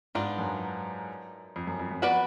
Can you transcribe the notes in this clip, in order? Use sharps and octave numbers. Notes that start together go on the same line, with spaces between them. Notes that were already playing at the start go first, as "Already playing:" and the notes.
G#2 B3 D4 F4
F#2
F2
F#2
F2
F#2
B3 F#4 B4 D5